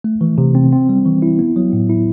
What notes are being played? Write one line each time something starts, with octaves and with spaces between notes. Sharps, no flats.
A3
E3
C3
C4
C4
G3
E3
E4
B3
F#3
A2
E4